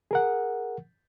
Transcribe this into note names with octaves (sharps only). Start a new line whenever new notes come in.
G#4 A#4 F#5